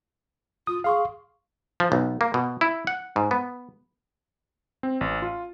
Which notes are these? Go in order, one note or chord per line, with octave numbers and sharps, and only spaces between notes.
F4 D#6
G#4 F5 C6 C#6
F3
B1
A#3
B2
E4
F#5
G#2
B3
C4
A1
F4